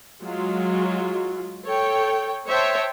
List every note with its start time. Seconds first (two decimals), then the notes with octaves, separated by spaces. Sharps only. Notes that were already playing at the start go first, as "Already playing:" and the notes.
0.22 F#3 G#3 F4
1.65 A4 C#5 G5
2.48 C5 C#5 E5 G5 A5